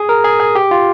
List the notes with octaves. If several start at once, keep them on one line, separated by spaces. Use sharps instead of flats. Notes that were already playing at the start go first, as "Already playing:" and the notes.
Already playing: G#4
A#4
G#4
G#4
G4
F4